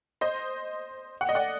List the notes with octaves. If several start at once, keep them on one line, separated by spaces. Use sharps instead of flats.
C5 D#5
F#5
D#5
D5 F#5